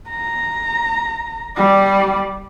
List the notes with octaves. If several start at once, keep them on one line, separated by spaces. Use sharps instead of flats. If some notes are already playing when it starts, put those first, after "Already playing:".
A#5
G3 D5